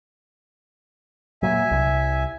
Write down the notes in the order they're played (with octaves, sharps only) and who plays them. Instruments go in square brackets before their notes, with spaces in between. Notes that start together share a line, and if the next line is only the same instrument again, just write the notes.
[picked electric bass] A#2 F#3 [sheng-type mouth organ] E5 G#5
[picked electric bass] C2